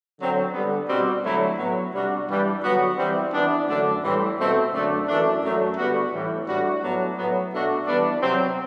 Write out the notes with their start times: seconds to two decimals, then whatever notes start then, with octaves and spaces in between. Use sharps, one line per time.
0.19 D3 F#3 C4
0.53 D3 G3 B3
0.88 B2 G3 C4 F#4
1.23 D3 F#3 A3 E4
1.58 A2 F#3 B3 F#4
1.93 C3 G3 D4 F#4
2.27 G2 E3 G3 D4
2.63 D3 F#3 B3 F#4
2.97 E3 G3 C4
3.33 E3 B3 D4
3.67 F#2 D3 A3 D4
4.02 A2 E3 G3 C4
4.37 B2 A3 C4
4.72 F#2 D3 A3 D4
5.07 F#2 E3 A3 D4
5.42 F#2 F#3 A3
5.77 D3 G3 B3 F#4
6.12 A2 E3 G3
6.47 A2 G3 D4 F#4
6.82 A2 F#3 B3 D4 F#4
7.17 A2 F#3 B3
7.52 B2 A3 D4 F#4
7.86 E3 G3 B3 D4
8.21 C3 F#3 C4